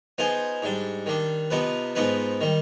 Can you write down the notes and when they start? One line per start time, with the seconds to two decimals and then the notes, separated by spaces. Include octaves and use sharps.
0.18 F3 B3 D#4 G#4 C5
0.62 G#2 G3 D4
1.06 D#3 G3 D4
1.50 C3 F3 B3 D#4 B4
1.95 G#2 F3 B3 D#4 B4
2.41 D#3 G3